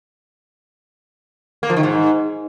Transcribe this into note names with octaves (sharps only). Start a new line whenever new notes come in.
A#3
F3
D#3
G#2